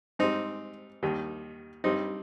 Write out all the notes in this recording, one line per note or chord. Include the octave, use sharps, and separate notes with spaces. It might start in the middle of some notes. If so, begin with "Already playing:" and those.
G#2 G3 C4 D#4
D#2 D#3 G3
G2 G3 C4 D#4